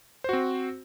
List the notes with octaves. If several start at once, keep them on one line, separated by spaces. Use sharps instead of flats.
C4 F#4 C5